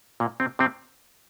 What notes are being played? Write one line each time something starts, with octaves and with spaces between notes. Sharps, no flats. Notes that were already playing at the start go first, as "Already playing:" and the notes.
A#2 A#3
C3 C4
C3 C4